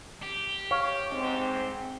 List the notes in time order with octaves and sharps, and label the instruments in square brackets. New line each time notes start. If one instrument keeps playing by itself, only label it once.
[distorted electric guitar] G4
[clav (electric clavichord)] C#5 F5
[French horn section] G#2 C4